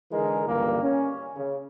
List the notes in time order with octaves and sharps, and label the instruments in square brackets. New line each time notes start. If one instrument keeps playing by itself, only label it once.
[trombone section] D3 E3 G#3 D#4 G#4 A#4
C#2 G2 D3 E3 G3 A#3
C#4
C#3